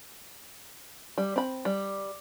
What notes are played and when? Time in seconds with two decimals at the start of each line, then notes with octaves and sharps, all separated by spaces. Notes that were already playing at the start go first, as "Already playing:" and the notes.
1.18 G3
1.36 C4 B5
1.65 G3